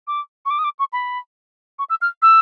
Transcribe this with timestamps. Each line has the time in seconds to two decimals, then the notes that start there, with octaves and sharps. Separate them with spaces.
0.07 D6
0.46 C#6
0.50 D6
0.59 D#6
0.64 D6
0.79 C#6
0.93 B5
1.79 C#6
1.90 E6
2.02 F6
2.22 E6